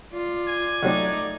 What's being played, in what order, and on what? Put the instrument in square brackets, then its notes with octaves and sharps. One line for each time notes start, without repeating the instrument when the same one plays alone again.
[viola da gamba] F4 [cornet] D5
[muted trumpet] G#5
[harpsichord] D3 F#3 C4 [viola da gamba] A3 D#4 [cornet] D5